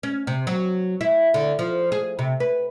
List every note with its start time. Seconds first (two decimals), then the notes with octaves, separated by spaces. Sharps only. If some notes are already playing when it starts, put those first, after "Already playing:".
0.03 C#4
0.27 C3
0.47 F#3
1.01 E4
1.34 D3
1.59 F3
1.92 G#4
2.19 C3
2.40 B4